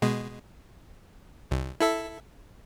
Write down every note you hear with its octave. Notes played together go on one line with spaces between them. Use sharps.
B2 G#3
C2
E4 A4 E5